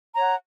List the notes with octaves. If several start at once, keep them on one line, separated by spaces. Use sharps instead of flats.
C#5 F#5 A#5